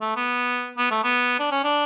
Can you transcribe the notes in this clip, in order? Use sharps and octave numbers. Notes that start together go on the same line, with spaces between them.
A3
B3
B3
A3
B3
D4
C#4
D4